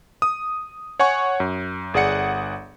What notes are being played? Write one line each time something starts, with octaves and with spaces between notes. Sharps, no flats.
D#6
C#5 F#5 G#5 C#6
F#2
G1 G#4 D5 F#5 C#7